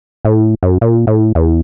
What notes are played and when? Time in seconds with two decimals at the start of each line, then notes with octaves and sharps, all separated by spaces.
0.25 A2
0.63 F#2
0.81 A#2
1.07 A2
1.35 E2